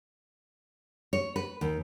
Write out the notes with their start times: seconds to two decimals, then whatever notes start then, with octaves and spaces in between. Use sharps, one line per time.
1.13 C#5
1.36 B4
1.61 D#2